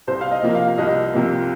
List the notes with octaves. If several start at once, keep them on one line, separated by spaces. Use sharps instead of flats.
C2 C5
F5
D#5
C3 F3 A#3
F5
C2 D#5
C3 F3 A#3